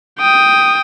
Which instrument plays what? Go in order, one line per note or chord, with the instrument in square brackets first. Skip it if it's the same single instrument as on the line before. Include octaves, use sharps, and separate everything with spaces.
[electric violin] G5 D#6